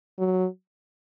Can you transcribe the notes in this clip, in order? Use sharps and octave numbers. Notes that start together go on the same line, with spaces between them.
F#3